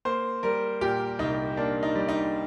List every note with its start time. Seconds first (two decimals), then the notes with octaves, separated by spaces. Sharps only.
0.05 A#3 C5
0.43 G3 A#4
0.81 A#2 G4
1.19 C2 D#4
1.57 A#3 D4
1.83 D#4
1.95 G3
2.09 D#4